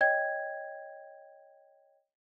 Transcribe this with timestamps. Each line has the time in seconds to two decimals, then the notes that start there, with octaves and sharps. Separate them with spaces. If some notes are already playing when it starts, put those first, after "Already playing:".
0.01 C#5 D#5 G5 G#6